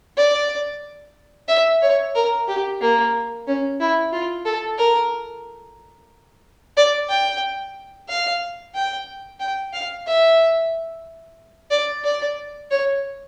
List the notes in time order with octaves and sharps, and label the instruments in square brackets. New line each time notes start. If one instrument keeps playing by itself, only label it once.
[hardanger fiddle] D5
E5
C#5
A#4
G4
A#3
C#4
E4
F4
A4
A#4
D5
G5
F5
G5
G5
F5
E5
D5
D5
C#5